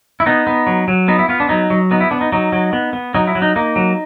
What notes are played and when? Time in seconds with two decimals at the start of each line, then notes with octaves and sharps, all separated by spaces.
0.20 E4
0.26 B3 D#4
0.47 B3
0.67 F#3
0.88 F#3
1.08 B3 D#4
1.19 E4
1.29 B3 F4
1.40 D4
1.49 F#3 D#4
1.70 F#3
1.91 B3 D#4
2.00 E4
2.11 B3 D4
2.21 D#4
2.32 F#3 D#4
2.52 F#3
2.73 B3
2.93 B3
3.14 F#3 D#4
3.27 E4
3.35 F#3
3.42 D#4
3.56 A#3 D#4
3.76 F#3